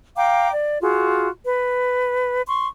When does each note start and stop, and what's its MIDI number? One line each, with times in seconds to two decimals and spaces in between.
0.17 0.51 77
0.17 0.51 79
0.17 0.51 82
0.17 0.51 86
0.52 0.79 74
0.82 1.27 65
0.82 1.27 66
0.82 1.27 68
1.44 2.40 71
2.47 2.67 84
2.47 2.67 85